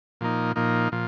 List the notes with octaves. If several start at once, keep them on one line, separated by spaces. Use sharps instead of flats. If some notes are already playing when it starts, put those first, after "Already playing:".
A#2 F3 A#3 D#4
A#2 F3 A#3 D#4
A#2 F3